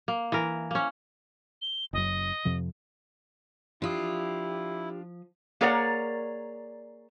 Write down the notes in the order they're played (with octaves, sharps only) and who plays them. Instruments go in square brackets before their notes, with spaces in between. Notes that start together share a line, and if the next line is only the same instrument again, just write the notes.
[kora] A#3
E3 A#4
A#3 C#4
[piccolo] G7
[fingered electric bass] F#1 F#2 [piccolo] D#5
[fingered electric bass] F2 C3 F3
[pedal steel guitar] F3 D#6 [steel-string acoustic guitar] D4 F4 [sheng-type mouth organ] E4 [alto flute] G4
[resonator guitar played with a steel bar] A#3 G#4 A#4 C#5 D5 F#5